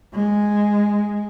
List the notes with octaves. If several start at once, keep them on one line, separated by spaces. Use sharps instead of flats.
G#3